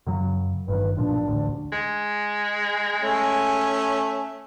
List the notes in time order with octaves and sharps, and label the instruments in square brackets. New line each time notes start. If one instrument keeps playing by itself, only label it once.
[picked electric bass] F#2 C#3 F#3
[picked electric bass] G1 G2 D#3 [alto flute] B4
[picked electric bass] B1 A#2 F3 [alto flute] D4
[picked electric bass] A1 D2
[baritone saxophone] G#3
[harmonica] A3 C#4 G#5